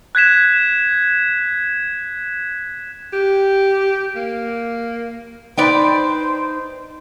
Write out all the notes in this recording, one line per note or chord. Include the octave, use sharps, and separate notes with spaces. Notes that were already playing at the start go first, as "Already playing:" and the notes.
F#6 G#6 B6 E7
G4
A#3
D#4 B4 C5 D5 G5